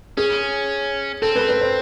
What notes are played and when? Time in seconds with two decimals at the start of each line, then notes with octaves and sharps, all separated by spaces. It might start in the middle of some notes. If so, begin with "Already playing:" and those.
0.17 C#4 G#4
1.22 C4 A4
1.36 B4
1.49 B4
1.61 C5